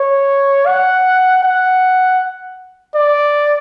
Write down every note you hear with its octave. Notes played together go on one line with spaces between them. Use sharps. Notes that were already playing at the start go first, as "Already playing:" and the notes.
Already playing: C#5
F#5
F#5
D5